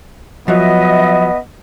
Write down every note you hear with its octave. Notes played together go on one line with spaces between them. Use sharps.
F3 F#3 B3 D#5 E5